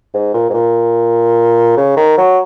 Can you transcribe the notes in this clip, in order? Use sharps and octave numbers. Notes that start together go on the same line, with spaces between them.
G#2
A#2
G#2
A#2
C#3
D#3
F#3